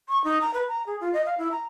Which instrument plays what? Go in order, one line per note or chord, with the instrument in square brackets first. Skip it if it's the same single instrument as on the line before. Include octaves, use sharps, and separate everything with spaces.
[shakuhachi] C#6
D#4
A#5
B4
A#5
G#4
F4
D#5
F5
E4
A#5